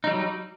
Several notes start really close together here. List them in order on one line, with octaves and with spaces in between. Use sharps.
D#4 G3 F#3